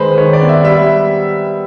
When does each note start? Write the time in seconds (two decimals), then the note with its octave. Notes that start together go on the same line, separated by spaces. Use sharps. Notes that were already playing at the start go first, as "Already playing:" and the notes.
Already playing: D#3 G#3 B4 C5
0.17 D#3 C#5
0.33 D5
0.41 B3
0.49 E5
0.64 G3 E5